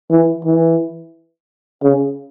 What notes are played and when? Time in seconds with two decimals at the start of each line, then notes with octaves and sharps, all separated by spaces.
0.10 E3
0.44 E3
1.82 C#3